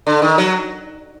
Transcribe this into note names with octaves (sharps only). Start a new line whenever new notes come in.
D3
D#3
F#3